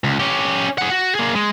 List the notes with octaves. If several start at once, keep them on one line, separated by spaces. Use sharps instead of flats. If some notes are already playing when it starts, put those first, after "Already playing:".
C#2
C#4 G4
G#4 F#5
F#4
A#3 G#4
G#3